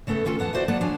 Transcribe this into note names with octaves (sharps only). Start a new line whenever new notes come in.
C#3 A3 B3 A4 F#5
D#3 C#4 F4 A4
E2 B3 F#5 A5
E4 F#4 C5 D5
A#3 B3 D5 F#5 A5
D#2 F3 D4 C#5 G#5